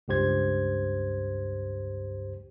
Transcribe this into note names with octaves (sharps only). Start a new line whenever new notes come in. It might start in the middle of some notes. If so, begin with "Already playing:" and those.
C#2 G2 G4 C5 G#6